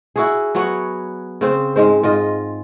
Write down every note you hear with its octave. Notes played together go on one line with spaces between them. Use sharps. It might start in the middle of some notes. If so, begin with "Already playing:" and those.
E4 F#4 G#4
F#3 B3 F#4 C#5
C#3 C4 C5
G#2 G#3 C5
G#2 F4 D#5